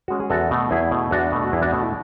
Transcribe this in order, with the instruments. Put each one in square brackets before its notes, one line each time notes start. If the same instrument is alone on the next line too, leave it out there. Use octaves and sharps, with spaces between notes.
[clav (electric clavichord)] G#3 C#4 F#4
G#4
E2 F#4 A4
B2 A3
E2 E4 G#4
B2 A3
E2 D4 F#4
B2 A3
F#4
E2 E4 G#4
D4 F#4
B2 A3
E4